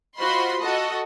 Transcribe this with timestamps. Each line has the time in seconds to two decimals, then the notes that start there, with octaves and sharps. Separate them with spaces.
0.18 F4 F#4 C5 D#5 B5 C6
0.59 F#4 A4 D#5